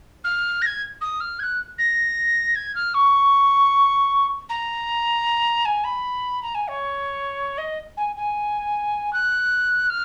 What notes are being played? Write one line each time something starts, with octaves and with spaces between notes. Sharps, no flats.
F6
A#6
G#6
D#6
F6
G#6
F#6
A#6
G#6
F6
C#6
A#5
G#5
B5
A#5
G#5
C#5
D#5
G#5
G#5
F#6
F6